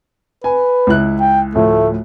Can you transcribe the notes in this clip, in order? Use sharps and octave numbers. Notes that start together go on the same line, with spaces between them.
B4 G#5
C#2 E4 F#6
G5
D2 A2 F3 A3